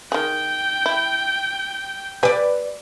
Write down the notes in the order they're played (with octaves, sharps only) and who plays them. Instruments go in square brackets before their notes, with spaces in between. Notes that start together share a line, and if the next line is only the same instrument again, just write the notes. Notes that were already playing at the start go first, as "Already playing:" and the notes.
[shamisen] D#3 G#4 [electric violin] G5
[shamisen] E4
[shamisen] G4 G#5 [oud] B4 D5